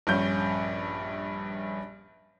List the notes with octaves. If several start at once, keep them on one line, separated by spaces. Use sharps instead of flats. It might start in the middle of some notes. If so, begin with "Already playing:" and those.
A#1 G2 C#4 G6